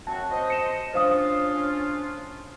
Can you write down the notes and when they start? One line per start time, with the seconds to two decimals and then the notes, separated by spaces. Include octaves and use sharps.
0.07 F#2 C4 F#4 A5
0.31 C5 D#5
0.50 C#7 E7
0.94 C#4 D4 F4 C5 F5 D#6